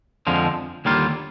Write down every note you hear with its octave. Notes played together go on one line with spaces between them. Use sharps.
F2 D3 F3 G#3
D#2 D3 G3 A#3 F4